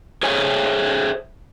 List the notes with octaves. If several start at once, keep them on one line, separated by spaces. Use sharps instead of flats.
G#4 A4 C5 C#5 E5 G#5